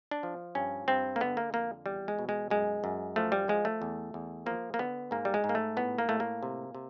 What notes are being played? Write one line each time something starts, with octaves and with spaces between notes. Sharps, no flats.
D4
F3
G2 C#4
G2 C4
A#3
D3 B3
A#3
F2 A#3
E2 G3
G#3
B2
G#3
F#2 G#3
F#2
F3 A3
G3
F3 G#3
A3
E2
E2
F3 A#3
A#3
D3 B3
G#2 A#3
G3
G#3
G#2
A#3
A3
A2 B3
A#3
A2 A3
A#3
C3
C3